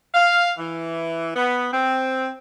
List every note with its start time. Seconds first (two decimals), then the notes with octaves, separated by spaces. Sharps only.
0.14 F5
0.59 E3
1.36 B3
1.73 C4